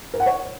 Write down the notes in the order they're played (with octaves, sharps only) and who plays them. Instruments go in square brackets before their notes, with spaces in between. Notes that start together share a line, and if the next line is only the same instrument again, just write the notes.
[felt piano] A#4
F#5
C#5